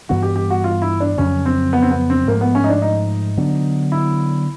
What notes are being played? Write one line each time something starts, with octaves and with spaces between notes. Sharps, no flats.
G2 E3 G3 B3 F#4
G4
G4
F#4
F4
E4
D4
F2 C#3 F#3 C#4
C4
B3
C4
B3
C4
G#2 F3 A3 A#3
B3
C#4
D#4
D4
D#4
D3 F#3 B3 D4
E4